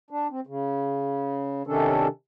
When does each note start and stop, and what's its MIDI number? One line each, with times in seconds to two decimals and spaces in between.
0.11 0.27 62
0.30 0.40 60
0.47 1.63 49
1.67 2.07 48
1.67 2.07 51
1.67 2.07 61
1.67 2.07 62
1.67 2.07 69